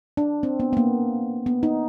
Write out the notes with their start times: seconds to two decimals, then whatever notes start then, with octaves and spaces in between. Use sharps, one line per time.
0.17 D4
0.43 C4
0.60 B3
0.73 B3
0.77 A#3
1.46 B3
1.63 D#4